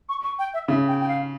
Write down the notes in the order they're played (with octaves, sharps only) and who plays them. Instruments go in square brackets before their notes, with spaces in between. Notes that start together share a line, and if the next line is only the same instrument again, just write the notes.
[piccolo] C#6
C#6
G5
E5
[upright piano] C#3 [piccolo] E5
[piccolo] G5
G5
F5